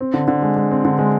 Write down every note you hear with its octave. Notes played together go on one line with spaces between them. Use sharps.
C4
D3
D3
G#3
G#3
C4
D3
G#3